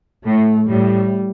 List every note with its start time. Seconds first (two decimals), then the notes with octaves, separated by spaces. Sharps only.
0.25 A2 A3
0.69 A2 G3